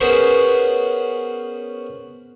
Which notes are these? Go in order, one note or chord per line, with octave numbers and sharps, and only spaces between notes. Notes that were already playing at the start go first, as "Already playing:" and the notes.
B3 C#4 F#4 G#4 A#4 C5